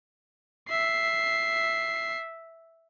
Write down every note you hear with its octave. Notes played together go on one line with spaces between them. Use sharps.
E5 C7